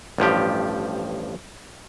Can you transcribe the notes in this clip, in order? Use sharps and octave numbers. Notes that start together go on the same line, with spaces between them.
A1 G2 F3 G4